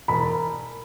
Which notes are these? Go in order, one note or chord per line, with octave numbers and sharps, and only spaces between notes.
E1 B5